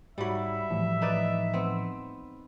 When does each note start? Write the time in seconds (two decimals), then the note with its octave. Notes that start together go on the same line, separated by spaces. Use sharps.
0.18 G#2 F#3 G3 E5 B5
0.70 A2 E3 F3
1.02 D#4 B4 D5
1.53 B3 C4